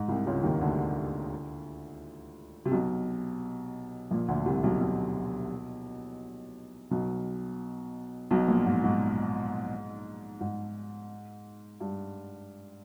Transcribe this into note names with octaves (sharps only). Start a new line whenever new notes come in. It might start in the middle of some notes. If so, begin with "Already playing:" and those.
Already playing: G#2
C2 C3
C#2 C#3
D#2 D#3
D2 D3
C3
B1 B2
A#1 A#2
D2 D3
C2 C3
B1 B2
B1 B2
B1 B2
B1 B2
A#1 A#2
G#2
G#2
G#2
G2